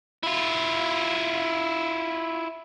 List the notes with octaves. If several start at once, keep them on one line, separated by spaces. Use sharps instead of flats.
E4 F4